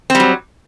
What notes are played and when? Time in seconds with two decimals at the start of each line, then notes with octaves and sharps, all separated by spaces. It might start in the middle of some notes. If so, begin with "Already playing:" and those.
0.10 C4
0.15 G3
0.20 F#3